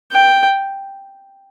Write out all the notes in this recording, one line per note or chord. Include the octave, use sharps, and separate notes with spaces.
G5